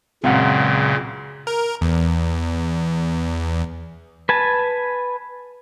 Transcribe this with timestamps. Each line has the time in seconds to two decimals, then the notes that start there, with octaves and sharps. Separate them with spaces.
0.24 C#2 F#2 A#2 C#3 C4 F5 F#5
1.47 A#4
1.81 E2
4.29 B4 G#5 A5